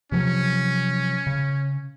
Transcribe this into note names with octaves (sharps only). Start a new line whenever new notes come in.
C3 F3 F#3 C#4
C#3